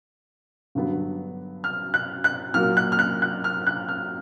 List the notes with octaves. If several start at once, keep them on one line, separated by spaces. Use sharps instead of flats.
G2 D3 F#3 B3
F6
F#6
F#6
A#2 F#3 A#3 F6
F#6
F6
F#6
F#6
F6
F#6
F6